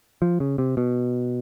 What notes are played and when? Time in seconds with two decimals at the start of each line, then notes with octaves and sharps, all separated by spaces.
0.22 F3
0.40 C#3
0.58 C3
0.77 B2